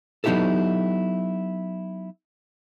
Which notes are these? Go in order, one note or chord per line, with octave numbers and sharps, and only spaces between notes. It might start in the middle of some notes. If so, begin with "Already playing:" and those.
F#3 B3 D#4 E4 G4 A4